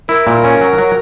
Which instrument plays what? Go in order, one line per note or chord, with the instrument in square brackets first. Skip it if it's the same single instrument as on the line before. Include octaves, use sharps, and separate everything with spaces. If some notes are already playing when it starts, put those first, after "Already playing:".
[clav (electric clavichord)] E4 [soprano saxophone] A#4
[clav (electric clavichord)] A#2
C#4
F#3
F#3